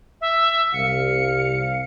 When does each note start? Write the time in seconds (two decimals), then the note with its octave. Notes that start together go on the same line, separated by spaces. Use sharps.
0.21 E5
0.74 C2 F5 C#7